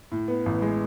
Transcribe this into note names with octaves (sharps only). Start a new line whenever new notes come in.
A2
B3
A1
G#3